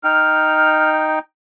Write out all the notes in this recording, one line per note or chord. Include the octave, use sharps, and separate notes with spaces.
D#4 G5 F6